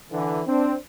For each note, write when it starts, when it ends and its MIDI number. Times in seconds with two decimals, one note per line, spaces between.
0.11 0.41 50
0.11 0.41 52
0.47 0.75 60
0.47 0.75 62